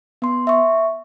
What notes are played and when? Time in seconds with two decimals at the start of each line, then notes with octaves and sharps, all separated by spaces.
0.22 B3 C6
0.47 E5 C#6